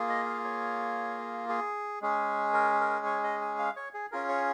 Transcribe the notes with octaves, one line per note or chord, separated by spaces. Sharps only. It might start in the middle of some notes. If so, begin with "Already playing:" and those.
Already playing: A#3 F4 G#4
D#5
F5
C#5
G#4
G#3 C#4 G#4
A#4
A#4
C#5
D#5
G#5
F5
C#5
G#4
C#4 F4 G#4 A#4
C#5